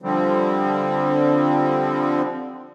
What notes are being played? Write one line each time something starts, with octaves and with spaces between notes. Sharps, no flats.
D3 F3 G3 C4